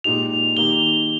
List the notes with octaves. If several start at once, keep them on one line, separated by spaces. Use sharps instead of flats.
A#2 G#3 D#4 G4 F7
D#3 A#3 D#4 G4 G7